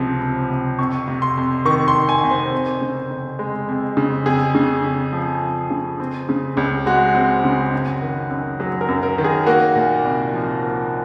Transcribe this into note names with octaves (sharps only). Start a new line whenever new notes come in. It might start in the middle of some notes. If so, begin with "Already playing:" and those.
Already playing: C#2 C3 F3 C4
C4
C3
F2 C#6
C3
C6
F2
D#3 C#6
C6
F2
G#5
C3
C5
F2
C#3
F2
G#3
F2
C#3
F2 G#4
C#3
F2
F3
F2
C#3
C4
C#3
C#2
G#3 F#4
C4
C#3
F#2
D#3
F#2
F#3 G#4
A#4
F#2
A#4
D#3
G#4
A#3 F#4
A#2
C2
F3
A#3